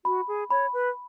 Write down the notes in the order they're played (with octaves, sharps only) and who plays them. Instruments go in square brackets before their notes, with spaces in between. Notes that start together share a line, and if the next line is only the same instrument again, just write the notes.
[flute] F#4 [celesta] B5
[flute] G#4
[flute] C#5 [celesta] B5
[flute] B4